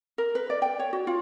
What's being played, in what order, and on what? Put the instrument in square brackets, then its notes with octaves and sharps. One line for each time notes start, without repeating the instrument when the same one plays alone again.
[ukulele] A#4
B4
D5
G5
C#5
F#4
F4